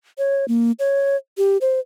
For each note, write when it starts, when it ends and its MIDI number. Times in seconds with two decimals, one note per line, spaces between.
0.18 0.47 73
0.48 0.72 58
0.79 1.16 73
1.38 1.57 67
1.61 1.80 72